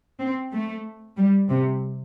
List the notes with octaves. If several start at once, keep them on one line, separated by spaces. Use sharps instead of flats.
C4
A3
G3
C3